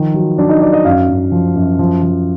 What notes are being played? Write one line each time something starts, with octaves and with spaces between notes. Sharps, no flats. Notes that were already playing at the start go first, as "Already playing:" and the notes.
Already playing: D#3 F3
F#3
F#3 D4
D#4
F#3 D5
D#5
F#2 F5
F#2
F3
F#2
F3
F3